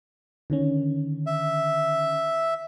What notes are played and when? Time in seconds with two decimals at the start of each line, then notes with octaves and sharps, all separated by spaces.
0.50 D3 D#3 C#4
1.27 E5